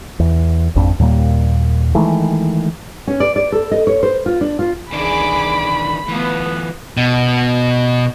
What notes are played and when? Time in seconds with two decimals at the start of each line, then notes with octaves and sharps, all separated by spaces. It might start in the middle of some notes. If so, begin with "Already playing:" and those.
0.20 E2
0.76 G#1 F2 D4
0.99 D#2 A#2 G3 A#3
1.95 D#3 E3 G#3 A3
3.07 C#4
3.20 D5
3.36 D5
3.52 A4
3.71 D#5
3.87 C#5
4.03 C5
4.26 F4
4.41 D4
4.59 F4
4.93 C2 D#3 E3 D4 G#4 B5 D6
6.08 E3 A3 B3 F4
6.97 B2